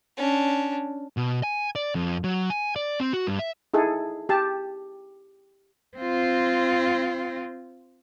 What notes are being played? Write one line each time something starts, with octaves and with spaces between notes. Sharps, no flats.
C#4 D4
B2
G#5
D5
F2
F#3
G#5
D5
C4
F#4
G2
E5
D#4 E4 G#4 A4
G4 A5
C4 F4